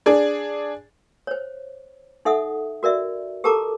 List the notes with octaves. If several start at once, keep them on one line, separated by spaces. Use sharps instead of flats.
D4 G#4 D5
C5 C#5
D#4 A4 E5 F#5 D#6
F#4 A#4 D5 E5
G4 A4 A#4 A5 A#5 D6